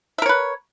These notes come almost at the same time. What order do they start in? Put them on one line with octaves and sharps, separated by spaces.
E5 A#4 C#5 B4